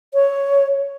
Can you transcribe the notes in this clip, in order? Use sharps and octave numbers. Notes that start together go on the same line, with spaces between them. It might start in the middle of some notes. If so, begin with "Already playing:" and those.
C#5